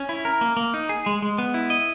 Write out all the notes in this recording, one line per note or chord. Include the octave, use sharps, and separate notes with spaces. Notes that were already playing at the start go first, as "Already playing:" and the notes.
Already playing: C#4
E4
A#4
A#3
A#3
D#4
G#4
G#3
G#3
B3
E4
D#5